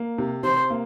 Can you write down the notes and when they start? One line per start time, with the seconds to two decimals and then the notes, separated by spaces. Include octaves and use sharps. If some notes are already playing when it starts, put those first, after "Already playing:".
Already playing: A#3
0.18 C3
0.43 C3 C5
0.70 A#3